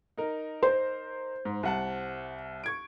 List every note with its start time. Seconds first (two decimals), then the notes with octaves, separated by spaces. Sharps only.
0.17 D#4 A#4
0.63 C5
1.45 G#2
1.63 C2 F#5 A5
2.64 C#6 G#6 D7